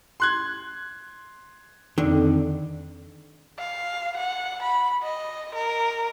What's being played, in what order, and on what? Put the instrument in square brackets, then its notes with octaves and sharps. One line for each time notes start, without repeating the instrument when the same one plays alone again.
[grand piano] C6 F#6 G#6
[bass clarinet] F2 [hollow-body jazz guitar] D3 D#3
[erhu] F5
F#5
B5
D#5
A#4